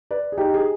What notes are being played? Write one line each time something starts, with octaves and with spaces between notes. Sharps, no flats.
B4 D5
G#4
D#4 G4
G#4